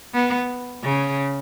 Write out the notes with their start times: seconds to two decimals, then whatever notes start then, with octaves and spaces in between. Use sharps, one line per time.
0.14 B3
0.83 C#3